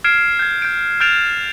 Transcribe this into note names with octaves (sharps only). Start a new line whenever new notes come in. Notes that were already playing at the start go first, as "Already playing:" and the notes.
F6 G#6 C7 D7 E7
G6 G#6
G6 D7
F6 G6 A6 D7 E7 F7